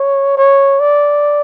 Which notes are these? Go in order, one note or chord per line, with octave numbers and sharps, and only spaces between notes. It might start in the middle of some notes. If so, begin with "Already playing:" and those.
Already playing: C#5
C#5
D5